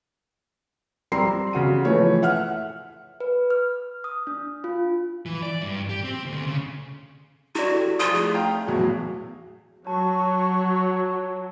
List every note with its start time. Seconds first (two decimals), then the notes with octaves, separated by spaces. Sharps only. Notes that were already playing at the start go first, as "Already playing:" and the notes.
1.12 G3 C4 A#5 C6 C7
1.53 C#3 F#4 D#7
1.85 E3 F3 A3 C#5
2.22 E5 F#5 F6
3.20 B4
3.50 F6
4.04 D#6
4.27 D4
4.64 F4
5.26 E3
5.42 D5
5.62 G2
5.90 G4
6.04 C4
6.25 D2
6.46 C#3
7.55 E4 F#4 D5
7.71 G4 A4
7.99 F3 F4 D#6
8.13 A3 G#4
8.34 F5 G5 A#5
8.67 B1 E2 A2 F#4
9.87 F#3 C#5 A5 C#6